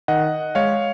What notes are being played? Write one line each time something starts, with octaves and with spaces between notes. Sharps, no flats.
D#3 D#5 F#5
G#3 C#5 F5